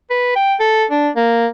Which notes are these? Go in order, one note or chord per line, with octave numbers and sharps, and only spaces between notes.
B4
G5
A4
D4
A#3